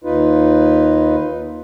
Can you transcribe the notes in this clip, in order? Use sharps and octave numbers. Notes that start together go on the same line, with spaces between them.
D#2 D#4 F4 B4